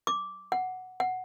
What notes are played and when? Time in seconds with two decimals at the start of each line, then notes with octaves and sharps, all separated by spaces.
0.07 D6
0.52 F#5
1.00 F#5